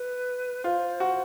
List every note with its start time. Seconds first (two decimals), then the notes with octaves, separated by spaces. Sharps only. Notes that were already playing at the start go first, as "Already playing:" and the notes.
Already playing: B4
0.63 F4 C5
1.00 F#4